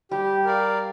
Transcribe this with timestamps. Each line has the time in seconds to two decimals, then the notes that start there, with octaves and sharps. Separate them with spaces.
0.11 G3 G4
0.45 A#4 D5 F5